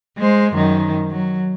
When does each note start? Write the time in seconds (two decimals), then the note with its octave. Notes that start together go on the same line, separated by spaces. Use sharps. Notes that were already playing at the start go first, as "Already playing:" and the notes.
0.18 G#3 C5
0.52 F#2 D#3
1.11 F#3